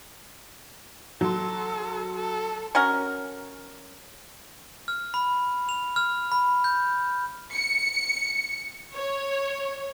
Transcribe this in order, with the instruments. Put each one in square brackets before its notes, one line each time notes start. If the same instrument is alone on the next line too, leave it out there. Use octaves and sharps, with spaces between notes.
[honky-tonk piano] F#3 C6 [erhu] A4
[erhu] A4
[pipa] C#4 F#4 A#4
[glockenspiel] F6
B5
F7
F6
B5
G6
[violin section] C#7
C#5